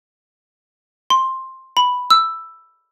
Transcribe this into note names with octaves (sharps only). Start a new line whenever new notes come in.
C6
B5
E6